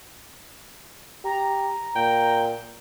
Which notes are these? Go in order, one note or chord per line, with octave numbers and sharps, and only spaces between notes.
G4 A#5
A#2 G5